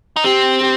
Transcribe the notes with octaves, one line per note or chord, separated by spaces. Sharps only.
D#4
C4 G4
G4